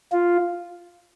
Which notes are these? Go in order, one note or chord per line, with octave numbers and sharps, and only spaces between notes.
F4